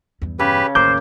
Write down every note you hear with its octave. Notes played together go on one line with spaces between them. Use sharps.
E2 G2
C#3 G4 B4
A1 D#2 A#4 C5 D6 G6